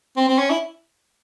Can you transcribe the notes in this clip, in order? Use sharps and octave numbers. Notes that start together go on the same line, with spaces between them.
C4
C4
C#4
E4